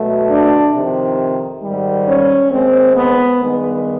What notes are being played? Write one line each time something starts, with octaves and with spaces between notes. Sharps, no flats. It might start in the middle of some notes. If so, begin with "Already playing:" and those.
Already playing: B2 F#3 A3
D4
F2 C3 D#3
G#2 D#3 G3
C#4
D#2 D#3 G#3 C4
B3
G2 D#3 G#3 B3